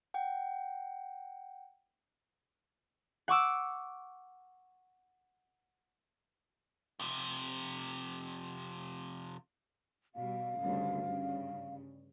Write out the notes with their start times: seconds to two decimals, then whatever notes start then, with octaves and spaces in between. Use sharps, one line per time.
0.14 F#5 G5
3.28 F#5 C#6 D6 E6
7.00 F2 C3
10.16 B2 G3 F5
10.58 D2 G2 C#3
11.02 G2 C#3